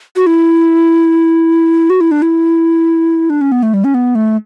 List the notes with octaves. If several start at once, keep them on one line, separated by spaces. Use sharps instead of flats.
F#4
E4
F#4
E4
D4
E4
D4
C#4
B3
A3
G3
C#4
B3
A3